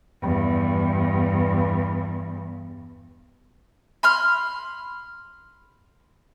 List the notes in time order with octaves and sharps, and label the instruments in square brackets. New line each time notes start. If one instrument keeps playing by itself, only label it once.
[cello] E2 G2
[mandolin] B5 C6 F6